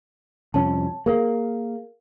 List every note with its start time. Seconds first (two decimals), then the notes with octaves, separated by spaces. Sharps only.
0.54 C2 F2 C#4 A5
1.06 A#3 G#4 A#4 F5